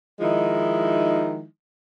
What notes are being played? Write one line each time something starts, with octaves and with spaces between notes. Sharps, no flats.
D#3 F3 G#3 D#4 E4